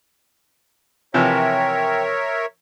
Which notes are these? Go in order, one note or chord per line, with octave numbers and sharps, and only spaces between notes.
C3 E3 F3 A#4 C#5 E5 G5